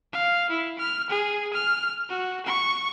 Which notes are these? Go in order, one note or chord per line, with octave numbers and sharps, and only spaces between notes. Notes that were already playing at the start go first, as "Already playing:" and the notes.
F5
E4
F6
G#4
F6
F#4
C#6